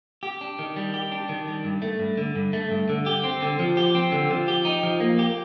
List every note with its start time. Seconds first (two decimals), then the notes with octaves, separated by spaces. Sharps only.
0.23 G4
0.41 D4
0.59 D#3
0.76 G3
0.94 G4
1.12 D4
1.29 D#3
1.47 G3
1.64 G2
1.82 A3
1.99 G2
2.17 D3
2.36 G2
2.53 A3
2.71 G2
2.89 D3
3.06 G4
3.24 C4
3.42 D3
3.59 F3
3.77 G4
3.95 C4
4.12 D3
4.31 F3
4.48 G4
4.65 D#4
4.83 F3
5.00 A#3
5.19 G4